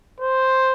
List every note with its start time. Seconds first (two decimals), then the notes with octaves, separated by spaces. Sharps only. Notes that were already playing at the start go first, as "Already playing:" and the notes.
0.20 C5